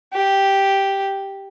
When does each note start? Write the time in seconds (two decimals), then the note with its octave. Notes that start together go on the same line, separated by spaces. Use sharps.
0.14 G4